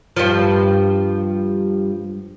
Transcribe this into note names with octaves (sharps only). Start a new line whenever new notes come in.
G2 F3